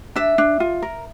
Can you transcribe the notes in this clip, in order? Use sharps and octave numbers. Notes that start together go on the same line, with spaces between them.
D4 E5
D4
F4
A#4